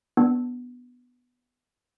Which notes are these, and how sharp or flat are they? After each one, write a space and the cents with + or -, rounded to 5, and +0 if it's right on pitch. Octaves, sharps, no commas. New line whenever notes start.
B3 +0 D4 +0